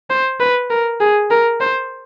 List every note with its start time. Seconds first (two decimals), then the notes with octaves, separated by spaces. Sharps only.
0.10 C5
0.40 B4
0.70 A#4
1.01 G#4
1.31 A#4
1.61 C5